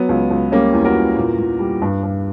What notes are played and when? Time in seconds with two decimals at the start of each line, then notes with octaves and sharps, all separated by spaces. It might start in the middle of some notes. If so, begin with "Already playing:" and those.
Already playing: F#3 B3
0.09 C#2
0.31 C#2
0.52 G3 A#3 C#4
0.73 E2
0.85 F#4 A#4
0.95 E2
1.17 A#2
1.38 A#2
1.59 G3
1.82 G2
2.03 G2